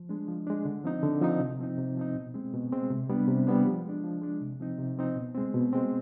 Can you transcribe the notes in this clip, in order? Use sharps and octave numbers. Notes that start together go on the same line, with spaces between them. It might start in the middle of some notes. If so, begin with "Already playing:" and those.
Already playing: F3
G#3 D4
F3
G#3 D4
D3
F3 C4 D#4
D3
F3 C4 D#4
C3
F3 C4 D#4
C3
F3 C4 D#4
B2
G#3 C4
B2
G#3 C4
C3
G3 B3 D4
C3
G3 B3 D4
F3
G#3 D4
F3
G#3 D4
C3
F3 C4 D#4
C3
F3 C4 D#4
B2
G#3 C4
B2
G#3 C4